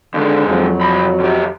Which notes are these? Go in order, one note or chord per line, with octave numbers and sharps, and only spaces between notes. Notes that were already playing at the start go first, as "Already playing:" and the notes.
D#2 D3 G#3
F2 F#3
C2 B5
D3 G4